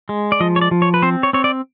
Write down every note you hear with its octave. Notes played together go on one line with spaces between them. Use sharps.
G#3
D5
F3 D#5
C#5
D5
F3
C#5
B4
C4 C5
C#5
C4 C#5
D5